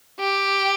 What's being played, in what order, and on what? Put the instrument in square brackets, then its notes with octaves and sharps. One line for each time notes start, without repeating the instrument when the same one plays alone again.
[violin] G4